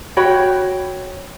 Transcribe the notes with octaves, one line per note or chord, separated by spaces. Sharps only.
F#4 C#5 G5 B5